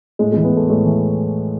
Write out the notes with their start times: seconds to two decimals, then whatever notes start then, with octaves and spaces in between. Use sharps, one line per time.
0.19 A2 G#3
0.32 E3 G#3
0.44 B3
0.52 A2 A3
0.69 A2 G#3
0.86 E3